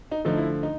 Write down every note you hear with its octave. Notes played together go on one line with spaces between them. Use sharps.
D#4
D3 F3 A3 D#4
E4
D#4